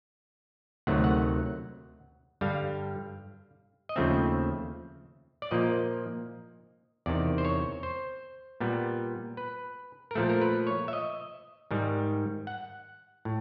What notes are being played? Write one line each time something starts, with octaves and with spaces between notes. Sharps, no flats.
D2 C3 D#3 F#3 A3 F#5
F#5
G2 D3 G3 F5
D#5
D#2 C#3 F3 A3 C4 E5
D5
A#2 F3 A#3 D#5
E2 C3 D#3 D5
C5
C#5
C5
A#2 G3 B3
B4
A#4
A#2 F3 A3 A4
A#4
B4
C#5
E5
D#5
G#2 D#3 G3
F#5
A2